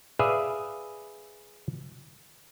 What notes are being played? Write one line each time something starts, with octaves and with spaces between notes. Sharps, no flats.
G#4 B4 D5 E5 F5